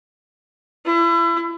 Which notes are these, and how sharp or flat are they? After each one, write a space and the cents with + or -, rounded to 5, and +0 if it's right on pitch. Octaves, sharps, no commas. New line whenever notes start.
E4 +35